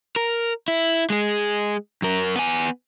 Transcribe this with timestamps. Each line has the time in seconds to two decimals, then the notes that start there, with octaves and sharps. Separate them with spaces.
0.16 A#4
0.68 E4
1.10 G#3 G#4
2.02 F#2 A#4
2.36 B3 G#5